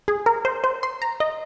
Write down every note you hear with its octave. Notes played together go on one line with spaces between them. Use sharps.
G#4
A#4
C5
C5
C6
A#5
D#5